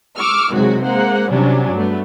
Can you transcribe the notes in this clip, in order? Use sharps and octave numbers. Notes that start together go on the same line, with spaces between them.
C#6 D6 E6 F6
C3 D#3 F#3 G#3 F#4
G#3 A#3 C5 F#5
C3 F#3 G3 C#4 D4
G2 A3 B3